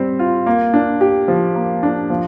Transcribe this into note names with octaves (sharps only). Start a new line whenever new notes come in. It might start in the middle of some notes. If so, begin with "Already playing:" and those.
Already playing: G3 C4
F4
A#3
D4
G4
F3
A#3
D4
F3